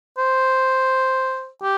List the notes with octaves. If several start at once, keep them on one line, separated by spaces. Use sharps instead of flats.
C5
G4